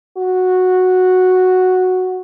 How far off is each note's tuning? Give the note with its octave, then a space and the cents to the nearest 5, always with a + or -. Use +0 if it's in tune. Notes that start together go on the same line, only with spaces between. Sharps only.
F#4 -5